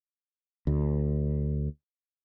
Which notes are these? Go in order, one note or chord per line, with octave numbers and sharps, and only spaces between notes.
D2